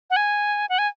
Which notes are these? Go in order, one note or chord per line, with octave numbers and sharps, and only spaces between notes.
F#5
G#5
F#5
G#5